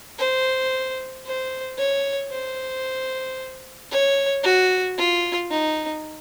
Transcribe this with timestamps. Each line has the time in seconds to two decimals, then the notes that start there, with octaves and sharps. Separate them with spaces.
0.19 C5
1.26 C5
1.78 C#5
2.31 C5
3.91 C#5
4.44 F#4
4.97 F4
5.51 D#4